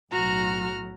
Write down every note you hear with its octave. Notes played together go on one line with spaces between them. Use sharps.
B1 A2 F#3 F#4 A#5 F6